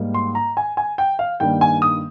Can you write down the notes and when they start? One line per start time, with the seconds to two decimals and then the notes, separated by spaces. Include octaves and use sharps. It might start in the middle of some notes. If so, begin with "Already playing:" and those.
Already playing: G#2 G3 A#3
0.14 C6
0.35 A#5
0.57 G#5
0.77 G#5
0.98 G5
1.19 F5
1.40 G2 D#3 G3 A#3 G5
1.61 G#5
1.82 D#6